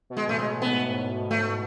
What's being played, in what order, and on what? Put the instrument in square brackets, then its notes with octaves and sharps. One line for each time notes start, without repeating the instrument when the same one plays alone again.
[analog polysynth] B2
[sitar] G#3
[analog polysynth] A2 [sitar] A3
[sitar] G#3
[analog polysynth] A2
[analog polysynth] G#2 [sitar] B3
[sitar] A3